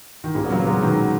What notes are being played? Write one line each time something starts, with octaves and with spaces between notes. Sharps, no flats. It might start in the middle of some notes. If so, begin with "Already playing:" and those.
D#3
A#2 C#3
B3
F#3 A#3
G#3 B3
B2 D#3